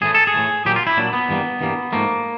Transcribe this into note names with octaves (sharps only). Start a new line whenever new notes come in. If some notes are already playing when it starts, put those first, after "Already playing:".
A2 E3 A3 G#4
A4
G#4
A2 E3 A3
A#2 F#3 A#3 G4
F4
E4
A#2 F#3 A#3 D4
B3
G2 E3 G3 A#3
G2 E3 G3 A#3
G#2 F3 A3 A#3